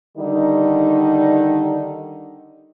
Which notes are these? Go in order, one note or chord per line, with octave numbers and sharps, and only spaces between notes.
D3 D#3 G3 D#4